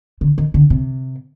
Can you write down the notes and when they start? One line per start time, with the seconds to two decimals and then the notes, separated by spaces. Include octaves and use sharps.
0.21 D3
0.38 D#3
0.54 D3
0.70 C3